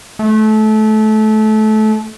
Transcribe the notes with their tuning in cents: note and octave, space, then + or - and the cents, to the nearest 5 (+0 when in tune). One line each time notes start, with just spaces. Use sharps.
A3 -25